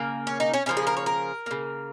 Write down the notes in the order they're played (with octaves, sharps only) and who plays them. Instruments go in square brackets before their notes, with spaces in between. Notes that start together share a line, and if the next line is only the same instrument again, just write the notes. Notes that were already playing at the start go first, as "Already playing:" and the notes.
Already playing: [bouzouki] C#3 A#3
C#4
D#4
C#4
C#3 F3 A#3 C#4
G#4
A#4
C#5
A#4
C#3 A#3